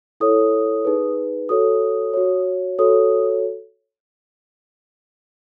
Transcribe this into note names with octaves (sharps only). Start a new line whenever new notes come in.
E4 A4 C#5 D#6
D#4 G#4 B4
F#4 A4 C#5 D#6
F#4 C#5
F#4 A4 C#5 D#6